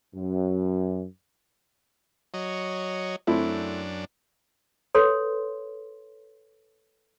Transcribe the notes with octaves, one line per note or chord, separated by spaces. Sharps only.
F#2
F#3 C#5 D#5
F#2 A3 C4 D4 E4
A4 B4 C#5 C6